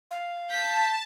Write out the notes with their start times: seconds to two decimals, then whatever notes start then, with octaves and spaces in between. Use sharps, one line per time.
0.11 F5
0.50 A5 G6 B6